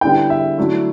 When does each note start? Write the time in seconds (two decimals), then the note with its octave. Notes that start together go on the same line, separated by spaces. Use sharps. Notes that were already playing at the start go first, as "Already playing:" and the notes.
0.01 D3 G3 B3 E4 G5
0.30 E5
0.58 D3 F#3 A3 E4